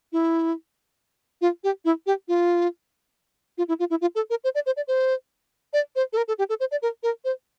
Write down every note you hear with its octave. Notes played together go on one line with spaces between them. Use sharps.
E4
F4
G4
E4
G4
F4
F4
E4
F4
E4
F4
A4
A#4
C5
D5
C5
D5
C5
D5
C5
A4
A#4
A4
G4
A4
C5
D5
A#4
A#4
C5